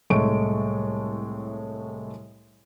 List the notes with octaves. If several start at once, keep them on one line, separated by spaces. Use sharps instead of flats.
C2 A2 G#3 A3 C#6 D7